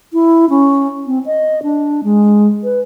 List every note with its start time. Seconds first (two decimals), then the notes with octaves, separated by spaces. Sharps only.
0.13 E4
0.50 C#4
1.07 C4
1.26 D#5
1.63 D4
2.04 G#3
2.64 B4